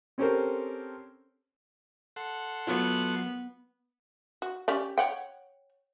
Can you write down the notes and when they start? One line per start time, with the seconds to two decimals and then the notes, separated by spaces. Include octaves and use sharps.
0.18 C4 C#4 G4 A4 A#4 C5
2.16 A4 F#5 C6
2.67 F#3 A3 B3 F4
4.42 F#4
4.68 C#4 G4 D5
4.98 C#5 F#5 G5